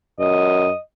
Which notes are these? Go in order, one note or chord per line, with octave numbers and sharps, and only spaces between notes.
F#2 D#5